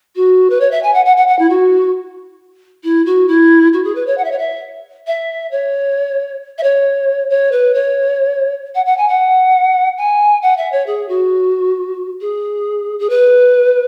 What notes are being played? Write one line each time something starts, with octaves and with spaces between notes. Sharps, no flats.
F#4
B4
C#5
E5
G#5
F#5
F#5
F#5
F#5
E4
F#4
E4
F#4
E4
F#4
G#4
B4
C#5
F#5
E5
C#5
E5
E5
C#5
E5
C#5
C#5
B4
C#5
F#5
F#5
G#5
F#5
G#5
F#5
E5
C#5
G#4
F#4
G#4
G#4
B4